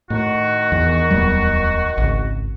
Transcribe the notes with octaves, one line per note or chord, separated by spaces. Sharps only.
A2 D#3 F#4
E2
D1 E2 G3
G#1 C#2